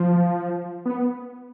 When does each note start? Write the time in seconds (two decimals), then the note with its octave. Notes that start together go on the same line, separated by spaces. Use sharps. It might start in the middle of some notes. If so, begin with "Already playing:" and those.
Already playing: F3
0.85 B3